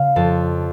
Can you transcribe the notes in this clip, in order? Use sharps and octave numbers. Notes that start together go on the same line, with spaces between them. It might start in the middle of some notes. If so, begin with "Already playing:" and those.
Already playing: C#3 F5
F2 A5